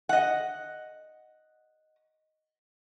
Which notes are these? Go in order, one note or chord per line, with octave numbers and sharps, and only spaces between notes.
D#5 F#5